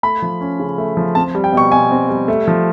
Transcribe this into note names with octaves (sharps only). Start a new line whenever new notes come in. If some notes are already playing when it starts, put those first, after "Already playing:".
A3 B5
F3
C#4
C#3
A3
F3
C4 A5
G3
G5
B2 C#6
B2 G#5
C4
G3
A3
F3